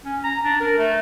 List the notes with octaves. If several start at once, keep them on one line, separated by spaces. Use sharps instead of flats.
C#4
A#5
D4
A#4
A3